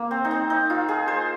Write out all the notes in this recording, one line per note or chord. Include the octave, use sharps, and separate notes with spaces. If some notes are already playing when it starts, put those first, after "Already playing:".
Already playing: A#3
C4
D#4
C4
D#4
F4
G#4
C5